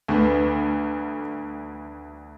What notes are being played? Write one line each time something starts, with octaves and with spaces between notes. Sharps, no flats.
D2 D3 B3